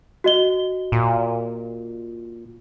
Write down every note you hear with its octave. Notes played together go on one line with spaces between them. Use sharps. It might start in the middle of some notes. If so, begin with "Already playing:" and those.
F#4 D#5 G7
A#2